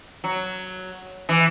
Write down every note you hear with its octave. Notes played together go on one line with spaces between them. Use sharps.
F#3
E3